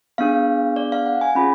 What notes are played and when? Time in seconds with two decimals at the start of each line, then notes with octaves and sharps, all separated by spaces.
0.18 B3 D4 G#4 F5
0.76 D5
0.92 F5
1.06 F#5
1.21 G#5
1.35 C#4 F4 G#4 B5